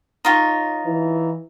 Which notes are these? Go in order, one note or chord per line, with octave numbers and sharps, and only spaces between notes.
D#4 F4 C#5
E3